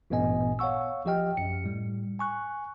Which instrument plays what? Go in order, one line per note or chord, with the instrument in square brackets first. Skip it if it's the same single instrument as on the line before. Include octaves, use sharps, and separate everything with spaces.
[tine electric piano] A1 G2 A#2 B3 D#5 G#5
C#5 F5 F#5 C#6 E6
A#1 F3 G4 D#5 G5 F6
F#2 C#7
A2 G3
G#5 C#6 F#6